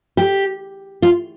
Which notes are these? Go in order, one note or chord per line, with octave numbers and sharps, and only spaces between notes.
G4
F4